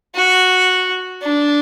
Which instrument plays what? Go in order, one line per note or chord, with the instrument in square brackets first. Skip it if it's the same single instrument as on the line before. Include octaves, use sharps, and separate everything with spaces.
[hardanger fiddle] F#4
D4